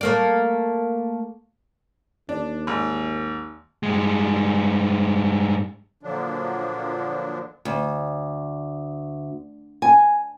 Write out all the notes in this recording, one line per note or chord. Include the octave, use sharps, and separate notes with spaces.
A3 A#3 D5
D#2 D4
G#1
G2 G#3
A#2 D3 F3 F#3 D4
D2
G#5